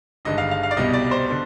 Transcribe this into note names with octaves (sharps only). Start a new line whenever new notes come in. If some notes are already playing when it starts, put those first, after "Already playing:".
G#1 G2 D3 G#3 D#5
F5
F5
F5
D5
C2 B2 G3 D#5
D5
C5
D3